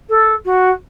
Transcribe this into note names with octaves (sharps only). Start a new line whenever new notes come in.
A4
F#4